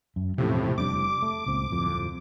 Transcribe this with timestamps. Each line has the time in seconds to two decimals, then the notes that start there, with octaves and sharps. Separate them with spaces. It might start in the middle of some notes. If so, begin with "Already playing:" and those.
0.16 F#2
0.38 E1 A2 C3 F3 C#4
0.78 F1 G3 D4 D6
1.22 A3
1.46 C#2 A#2 C4
1.70 D1 C2 F2